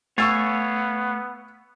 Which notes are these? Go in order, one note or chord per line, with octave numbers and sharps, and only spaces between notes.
A3 B3 C#5 F5 G#5 C#6 E6 A6